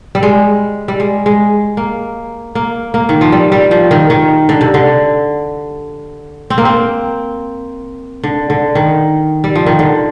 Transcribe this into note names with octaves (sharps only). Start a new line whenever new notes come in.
G3
G#3
G3
G#3
G#3
A#3
A#3
A#3
D#3
F3
G3
G3
F3
D#3
D#3
D3
C3
D3
C4
A#3
C4
D3
D3
D#3
G3
F3
D#3
D3